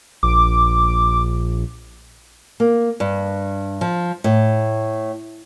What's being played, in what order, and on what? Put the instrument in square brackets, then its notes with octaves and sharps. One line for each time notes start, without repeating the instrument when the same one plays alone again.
[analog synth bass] A#1 [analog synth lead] D6
[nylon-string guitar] A#3
G2
F3
A2